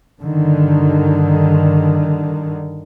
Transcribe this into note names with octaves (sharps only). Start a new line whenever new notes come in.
G2 D3 D#3